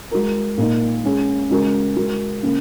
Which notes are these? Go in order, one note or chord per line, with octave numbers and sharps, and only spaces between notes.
G#3 F#4 A#4
A#2 A#3 D#4
G#3 C#4 G#4
C#3 G#3 F#4 A#4
G#3 F#4 A#4
C#3 A#3